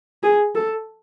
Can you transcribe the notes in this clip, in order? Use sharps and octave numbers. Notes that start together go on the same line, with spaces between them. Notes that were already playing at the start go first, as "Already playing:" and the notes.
G#4
A4